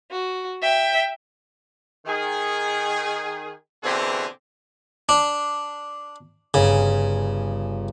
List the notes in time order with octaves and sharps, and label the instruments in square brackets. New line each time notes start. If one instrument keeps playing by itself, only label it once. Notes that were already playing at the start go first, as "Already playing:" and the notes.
[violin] F#4
E5 G5
[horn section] D#3 G#4
B2 D3 E3 C4 G4 G#4
[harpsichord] D4
[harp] G1 G#5 [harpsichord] C#3